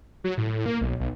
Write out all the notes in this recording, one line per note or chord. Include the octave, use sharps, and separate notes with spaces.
F#3
A2
A#3
B1
B1